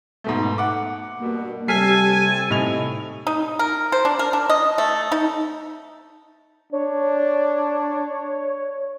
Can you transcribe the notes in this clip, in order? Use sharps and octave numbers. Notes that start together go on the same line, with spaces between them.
G#2 B2 A3
F#5 D6
G2 B2 A#3
C3 G3 A4 G#5 F6 B6 C7
A2 C3 D#4 F7
D#4
A#4
C5
D4
A#4
D4
D#5
A3
D#4
D4 C#5